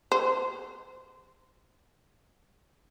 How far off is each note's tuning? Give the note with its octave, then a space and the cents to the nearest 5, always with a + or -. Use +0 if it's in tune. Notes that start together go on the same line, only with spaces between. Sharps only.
C5 -30